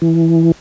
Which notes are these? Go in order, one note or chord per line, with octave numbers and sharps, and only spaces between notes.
E3